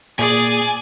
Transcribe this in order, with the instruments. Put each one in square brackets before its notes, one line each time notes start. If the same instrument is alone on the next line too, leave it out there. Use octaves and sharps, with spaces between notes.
[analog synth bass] A#2 [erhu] G#4 [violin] D5 [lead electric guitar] G#5